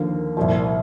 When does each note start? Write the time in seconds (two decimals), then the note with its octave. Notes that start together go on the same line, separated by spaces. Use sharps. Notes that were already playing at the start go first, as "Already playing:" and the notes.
Already playing: D#2 D3 F3 A#3
0.37 C2 A#2 F3